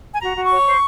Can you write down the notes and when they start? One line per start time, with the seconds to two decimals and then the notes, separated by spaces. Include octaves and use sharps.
0.13 G#5
0.21 F#4 A#5
0.36 F#4
0.44 C#6
0.51 C#5
0.66 C5